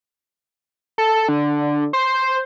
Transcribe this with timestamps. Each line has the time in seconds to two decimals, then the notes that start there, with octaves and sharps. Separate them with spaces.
0.98 A4
1.29 D3
1.93 C5